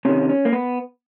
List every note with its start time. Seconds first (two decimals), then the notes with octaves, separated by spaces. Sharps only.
0.05 C3 D#3 C#4
0.29 C#4
0.45 A#3
0.53 B3